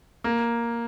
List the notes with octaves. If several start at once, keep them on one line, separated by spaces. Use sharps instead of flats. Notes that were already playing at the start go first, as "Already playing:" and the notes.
A#3